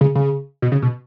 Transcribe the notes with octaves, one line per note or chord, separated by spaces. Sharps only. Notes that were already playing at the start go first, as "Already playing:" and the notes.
C#3
C#3
B2
C#3
B2